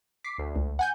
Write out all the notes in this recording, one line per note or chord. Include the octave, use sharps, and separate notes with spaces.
D6 B6 C7
D2
C#2
F#5 G#5 G6